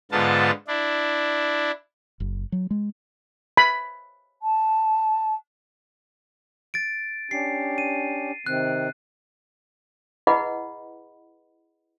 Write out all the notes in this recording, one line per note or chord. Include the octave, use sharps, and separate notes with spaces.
G#2 D3 B3 F4 A5
D4 E4
F#1
F#3
G#3
B5
A5
A6 D7
C#4 D4 G4 C7
D#7
C3 D#3 C4 F#6
E4 G#4 B4 D#5 F#5 B5